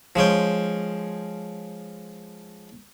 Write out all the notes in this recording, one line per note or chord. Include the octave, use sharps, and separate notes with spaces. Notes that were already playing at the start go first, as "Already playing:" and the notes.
F3 G#3 C#4 G5